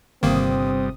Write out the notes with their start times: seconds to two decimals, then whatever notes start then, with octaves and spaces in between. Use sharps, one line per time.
0.23 G1 G2 C3 D#3 A#3 C4 D#6